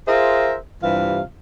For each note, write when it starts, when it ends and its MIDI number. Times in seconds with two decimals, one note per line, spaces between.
0.08 0.56 65
0.08 0.56 68
0.08 0.56 70
0.08 0.56 72
0.08 0.56 76
0.83 1.21 43
0.83 1.21 48
0.83 1.21 52
0.83 1.21 65
0.83 1.21 77